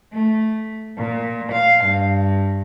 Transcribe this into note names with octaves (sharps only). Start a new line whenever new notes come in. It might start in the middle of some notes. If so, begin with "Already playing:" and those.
A3
A#2
F5
G2